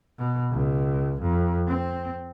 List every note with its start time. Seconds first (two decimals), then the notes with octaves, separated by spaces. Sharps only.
0.18 B2
0.51 C#2
1.22 F2
1.68 C4